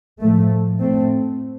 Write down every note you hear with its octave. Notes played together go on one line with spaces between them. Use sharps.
A2 F3 A3
A2 A3 C4